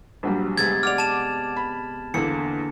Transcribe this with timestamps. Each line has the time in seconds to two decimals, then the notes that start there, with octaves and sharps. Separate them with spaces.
0.23 A#1 F#3 G3
0.58 C3 G#3 B3 G#6 A6
0.83 D5 F#5 D6 F6 F7
0.98 A5 E7
1.56 B5
2.14 E2 D3 A#3 C#7